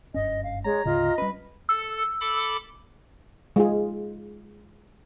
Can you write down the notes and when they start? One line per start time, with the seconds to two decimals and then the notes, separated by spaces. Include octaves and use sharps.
0.14 F#1 G2 C#4 D#5
0.44 F5
0.65 G#3 C#5 A#5
0.85 D2 G#2 C#3 F4 D#5
1.18 G3 C#4 B4
1.69 A4 E6
2.21 A4 B5 D6
3.56 G#3 F4 G#4